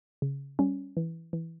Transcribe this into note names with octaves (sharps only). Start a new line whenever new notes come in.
C#3
G3 C#4
E3
E3